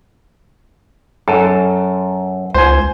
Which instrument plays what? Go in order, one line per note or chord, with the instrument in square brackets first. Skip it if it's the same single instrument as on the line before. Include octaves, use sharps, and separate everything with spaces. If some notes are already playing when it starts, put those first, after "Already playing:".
[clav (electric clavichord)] F#2 [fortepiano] A4
[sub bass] C#2 [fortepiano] C5 G#5